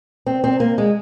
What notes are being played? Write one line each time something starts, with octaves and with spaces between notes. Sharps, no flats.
C4
C4
A#3
G#3